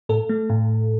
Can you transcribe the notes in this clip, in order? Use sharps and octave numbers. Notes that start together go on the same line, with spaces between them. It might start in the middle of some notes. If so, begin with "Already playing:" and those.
A2 A4
A3
A2